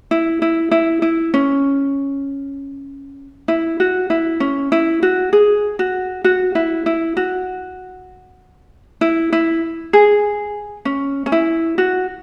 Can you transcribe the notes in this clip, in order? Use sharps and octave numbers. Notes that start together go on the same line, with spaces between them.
E4
E4
E4
E4
C#4
E4
F#4
E4
C#4
E4
F#4
G#4
F#4
F#4
E4
E4
F#4
E4
E4
G#4
C#4
C#4
E4
F#4